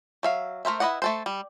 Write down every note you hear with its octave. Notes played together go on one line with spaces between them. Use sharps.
F#3 E5 F5
A3 A#4 C5 E5
E4 B4 D5 D#5 F#5
A3 A4 C5
G3